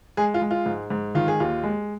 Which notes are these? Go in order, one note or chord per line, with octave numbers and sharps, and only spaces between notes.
G#3 G#4
F4
G#3
F4
G#2
G#2
D#3 F4
G#4
D#2 F4
G#3